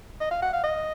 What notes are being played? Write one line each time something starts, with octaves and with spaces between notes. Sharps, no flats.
D#5
F5
F#5
F5
D#5